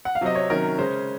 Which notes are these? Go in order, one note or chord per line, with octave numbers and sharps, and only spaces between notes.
F#5
F5
C3 F#3 C4 D#5
C#5
C3 D#3 F#3 C#4 A#4
C#3 G#3 C#4 C5